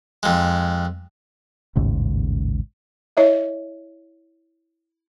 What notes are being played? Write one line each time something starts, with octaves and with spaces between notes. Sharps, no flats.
F2 G#3
A1 D#2 G#2 C#3
E4 C#5 D#5 E5